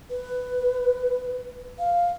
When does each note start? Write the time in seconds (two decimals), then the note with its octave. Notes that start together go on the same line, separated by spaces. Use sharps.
0.10 B4
1.79 F5